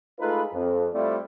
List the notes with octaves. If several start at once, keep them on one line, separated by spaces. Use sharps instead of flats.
G#3 A3 D#4 F4 A4 B4
F2
G3 A3 C4 E4 F4 D5